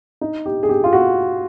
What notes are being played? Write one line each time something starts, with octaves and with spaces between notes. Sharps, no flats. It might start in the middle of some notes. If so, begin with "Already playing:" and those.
D#4
G4
G#4
G4
F4
F#4